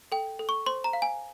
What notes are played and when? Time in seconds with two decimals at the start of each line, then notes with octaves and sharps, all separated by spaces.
0.12 A4 G5
0.39 A4
0.49 C#6
0.66 C5 C6
0.84 A#5
0.93 F5
1.02 G#5